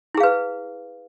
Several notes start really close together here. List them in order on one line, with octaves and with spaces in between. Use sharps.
E4 G#4 F5 B4